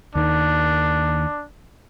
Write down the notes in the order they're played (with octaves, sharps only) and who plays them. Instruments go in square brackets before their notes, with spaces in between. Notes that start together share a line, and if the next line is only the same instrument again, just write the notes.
[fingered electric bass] D#2 D#3 [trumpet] D4